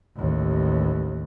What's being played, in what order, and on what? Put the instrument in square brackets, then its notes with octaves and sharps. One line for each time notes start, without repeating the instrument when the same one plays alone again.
[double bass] A1 D#2